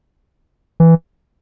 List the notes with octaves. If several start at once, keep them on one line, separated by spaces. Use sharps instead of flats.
E3